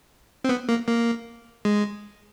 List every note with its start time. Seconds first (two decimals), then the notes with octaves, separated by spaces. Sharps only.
0.44 C4
0.49 B3
0.69 A#3
0.88 A#3
1.65 G#3